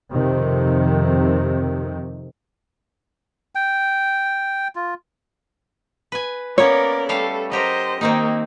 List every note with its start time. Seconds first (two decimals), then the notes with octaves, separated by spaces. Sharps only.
0.12 F2 C3 D#3
3.55 G5
4.76 F4
6.12 B4 G#5
6.58 A#3 B3 C#4 A#4 C#5 D5
7.09 G3 A3 A4 F5
7.52 F#3 G4 A#4 C5 D#5
8.01 D#3 A#3 C4 D#4